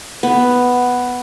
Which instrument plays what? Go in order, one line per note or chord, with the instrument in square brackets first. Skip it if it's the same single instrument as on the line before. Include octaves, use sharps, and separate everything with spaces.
[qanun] B3